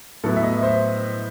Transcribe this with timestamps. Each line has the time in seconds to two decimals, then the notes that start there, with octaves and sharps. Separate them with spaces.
0.24 A2 F#3 B3 E4 A4
0.36 E5
0.43 D#5
0.63 C5